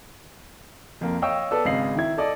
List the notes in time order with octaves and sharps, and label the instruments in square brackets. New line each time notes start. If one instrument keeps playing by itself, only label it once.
[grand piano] F2 A#3
C#5 D#5 F5 G5 C#6 E6
B3 A4 D5 E6
G#1 C#3 D#5 F5 C7 F#7
D#3 E4 G#6
A4 D5 D#5 D6